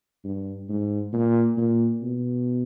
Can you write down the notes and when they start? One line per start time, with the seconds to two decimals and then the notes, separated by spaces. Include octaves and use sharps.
0.24 G2
0.69 G#2
1.13 A#2
1.57 A#2
2.02 B2